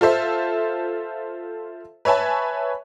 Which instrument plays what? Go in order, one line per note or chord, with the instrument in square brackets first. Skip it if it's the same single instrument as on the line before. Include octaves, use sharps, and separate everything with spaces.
[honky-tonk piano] F4 A4 C5 E5
B4 C#5 E5 G#5 A5